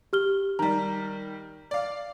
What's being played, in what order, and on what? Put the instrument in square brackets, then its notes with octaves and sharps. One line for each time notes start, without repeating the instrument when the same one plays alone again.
[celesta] G4 F6 G7
[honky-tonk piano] D#3 G3 [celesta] A#5
[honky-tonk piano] D5 F5